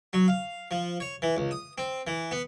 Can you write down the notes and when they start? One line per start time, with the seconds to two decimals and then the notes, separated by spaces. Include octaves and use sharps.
0.13 F#3
0.28 F5
0.71 F3
1.00 C#5
1.22 E3
1.37 C#2
1.51 D#6
1.78 C4
2.07 E3
2.31 B3